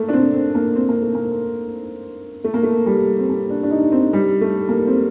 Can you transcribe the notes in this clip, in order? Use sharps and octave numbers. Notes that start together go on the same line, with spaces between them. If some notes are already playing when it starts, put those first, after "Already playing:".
Already playing: A3 A#3
D4
C4
C4
A#3
C4
A#3
A3
A#3
A3
A#3
A3
G3
C4
A#3
D4
D4
D#4
C4
G3
A3
A#3
C4